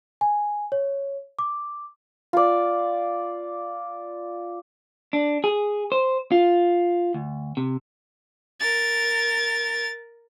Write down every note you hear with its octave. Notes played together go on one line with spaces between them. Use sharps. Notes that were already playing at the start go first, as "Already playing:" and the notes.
G#5
C#5
D6
F4 D5
D4
G#4
C5
F4
D2
C3
A#4 A6